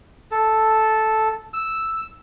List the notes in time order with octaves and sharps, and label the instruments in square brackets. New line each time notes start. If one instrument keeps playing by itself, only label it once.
[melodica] A4
E6